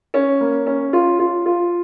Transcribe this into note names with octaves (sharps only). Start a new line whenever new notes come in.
C#4
A#3
C#4
F4
F4
F4